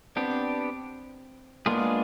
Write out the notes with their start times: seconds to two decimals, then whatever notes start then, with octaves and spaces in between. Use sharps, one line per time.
0.16 B3 C4 D4 G4
1.66 G#3 A#3 B3 D4 F4 G#4